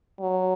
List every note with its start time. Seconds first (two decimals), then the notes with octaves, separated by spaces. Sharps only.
0.20 F#3